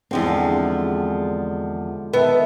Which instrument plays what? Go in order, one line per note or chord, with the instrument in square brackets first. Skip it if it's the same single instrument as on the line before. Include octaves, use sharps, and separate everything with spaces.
[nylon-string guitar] E2 F3 C4 [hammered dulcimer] D3 G#3 G4
[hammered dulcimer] D#3 A4 E5 [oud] B3